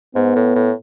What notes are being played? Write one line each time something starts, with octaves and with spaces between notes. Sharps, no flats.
G#2 B3
A2
A2